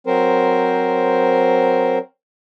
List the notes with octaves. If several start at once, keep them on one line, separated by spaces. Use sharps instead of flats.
F#3 C4 A#4 C5